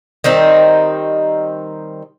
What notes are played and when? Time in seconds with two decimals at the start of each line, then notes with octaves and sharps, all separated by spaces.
0.24 D#3 G3 C4 D#4